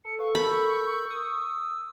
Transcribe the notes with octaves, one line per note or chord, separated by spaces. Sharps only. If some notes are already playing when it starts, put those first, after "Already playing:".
A4 C#7
B4 F5 C#6
A#4 B5 E6 G6
D#6 E6